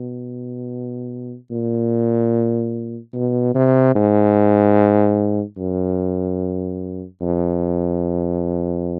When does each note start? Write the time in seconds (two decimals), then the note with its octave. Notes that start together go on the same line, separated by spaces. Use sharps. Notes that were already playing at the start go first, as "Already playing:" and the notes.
Already playing: B2
1.51 A#2
3.14 B2
3.55 C3
3.96 G#2
5.58 F#2
7.21 F2